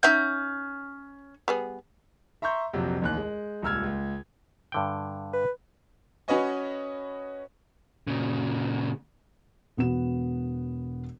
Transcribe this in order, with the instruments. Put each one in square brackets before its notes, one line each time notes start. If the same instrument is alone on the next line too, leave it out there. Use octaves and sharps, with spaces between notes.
[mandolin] C#4 G6 [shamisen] D#4 E5 F#5
[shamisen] G3 B3 G#4
[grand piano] E5 A#5 C6 C#6 G6
A#1 F2 C3 F#3
A1 D#2 F#6
G#3
D#1 C#2 E6 F6 G#6
C#2
[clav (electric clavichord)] G2 D3 G5
[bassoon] B4
[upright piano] C#4 F#4 B4 C#5 D#5 G#5
[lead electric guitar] A#2 C#3
[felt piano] E1 B3 F#4 E7